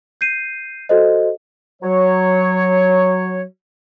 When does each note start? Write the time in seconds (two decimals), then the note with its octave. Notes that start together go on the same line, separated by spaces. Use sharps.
0.21 G6 C7 D#7
0.89 F#4 A4 C5 D#5
1.82 F#3 C#5